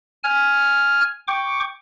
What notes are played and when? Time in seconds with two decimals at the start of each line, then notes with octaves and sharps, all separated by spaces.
0.24 G#5 F6
1.28 G5 C#6 D6